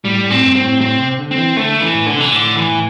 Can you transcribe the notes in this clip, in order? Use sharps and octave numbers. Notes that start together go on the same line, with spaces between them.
A2 G3
A2
C4
G2
C4
A2
A2 C4
C3
D3
C4
E3
D3 A3
E3
A2
D3
C3
E3
A2 D3
E3
A2